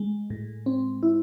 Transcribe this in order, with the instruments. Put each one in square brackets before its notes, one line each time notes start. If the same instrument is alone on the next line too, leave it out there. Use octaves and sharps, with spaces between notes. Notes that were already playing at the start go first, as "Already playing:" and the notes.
Already playing: [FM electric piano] G#3
A2
C4
E4